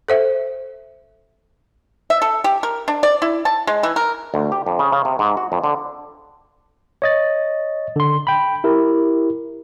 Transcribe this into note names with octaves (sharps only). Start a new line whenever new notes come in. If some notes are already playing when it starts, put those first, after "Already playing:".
A4 C5 E5
E5
A4
G4
A#4
D4
D5
E4
A5
G#3
E3
A#4
D2
G4
F2
C#3
C#3
C3
G#2
F#4
F2
D3
C#5 D#5 A6
D3 C6
G5 B5
E4 G4 A#4